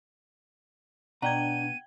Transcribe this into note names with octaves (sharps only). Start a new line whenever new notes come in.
B2 D4 F#5 G5 A#5 G#6 D#7